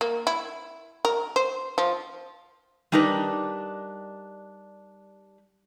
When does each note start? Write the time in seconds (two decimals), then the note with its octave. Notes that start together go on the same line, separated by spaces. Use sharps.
0.01 A#3
0.27 E4
1.05 A#4
1.36 C5
1.78 F3
2.92 G3 D4 D#4 A#4 B4